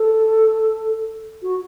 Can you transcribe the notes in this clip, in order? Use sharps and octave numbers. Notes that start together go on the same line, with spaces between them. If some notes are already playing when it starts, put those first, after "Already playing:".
Already playing: A4
F#4